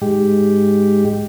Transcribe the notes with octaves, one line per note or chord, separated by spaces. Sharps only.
G#2 G#3 G4